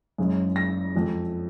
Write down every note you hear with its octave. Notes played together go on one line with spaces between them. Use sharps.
F#1 F#2 C#3 G#3
A#6
F2 F3 G#3